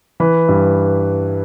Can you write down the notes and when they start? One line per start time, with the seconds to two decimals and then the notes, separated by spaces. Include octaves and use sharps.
0.20 E3 B4
0.49 G2